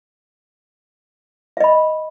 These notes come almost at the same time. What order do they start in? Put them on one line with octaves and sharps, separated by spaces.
E5 D#5 B5